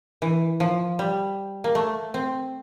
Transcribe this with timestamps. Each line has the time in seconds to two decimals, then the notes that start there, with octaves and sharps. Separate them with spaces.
0.22 E3
0.60 F3
0.99 G3
1.64 A#3
1.75 A3
2.14 C4